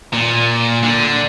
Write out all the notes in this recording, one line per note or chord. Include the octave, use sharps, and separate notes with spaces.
A#2
D3